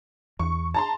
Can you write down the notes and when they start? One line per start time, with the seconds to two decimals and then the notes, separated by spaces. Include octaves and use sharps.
0.39 E2 C#6
0.74 A5 A#5 C6